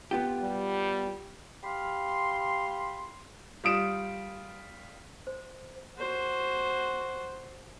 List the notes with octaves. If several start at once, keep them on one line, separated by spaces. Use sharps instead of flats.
B3 F4 G4
G3
G4 F5 B5 C6
G3 F4 D#6 D7 E7
C5
F#4 C5